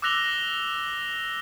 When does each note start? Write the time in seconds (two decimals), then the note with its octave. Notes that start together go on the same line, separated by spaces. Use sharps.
0.02 D6 E6 F#6 A#6 F7 G7